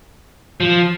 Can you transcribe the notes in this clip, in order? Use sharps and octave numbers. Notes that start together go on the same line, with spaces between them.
F3